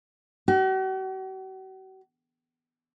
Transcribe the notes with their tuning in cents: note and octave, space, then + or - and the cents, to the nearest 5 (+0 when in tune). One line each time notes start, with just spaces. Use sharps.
F#4 +45